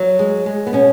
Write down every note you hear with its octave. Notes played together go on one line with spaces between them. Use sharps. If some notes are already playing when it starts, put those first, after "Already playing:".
Already playing: F#3
G#3
G#3
B3
B2 C#4